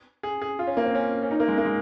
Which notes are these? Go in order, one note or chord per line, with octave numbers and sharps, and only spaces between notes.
G#4
G#4
F4
C#4
A#3
C4
C#4
C#4
D#4
A#3
G#3
A#3
G#3